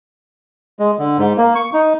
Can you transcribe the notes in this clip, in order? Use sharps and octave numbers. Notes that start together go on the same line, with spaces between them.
G#3
D3
G#2
A#3
C#6
D#4